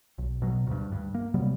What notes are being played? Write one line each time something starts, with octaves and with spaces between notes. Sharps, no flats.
B1
B2 F#3
D2 G2
G2
A#3
C3 F#3 G3 B3